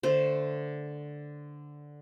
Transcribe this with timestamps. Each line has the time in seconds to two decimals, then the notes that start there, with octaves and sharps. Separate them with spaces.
0.03 D3 A3 C5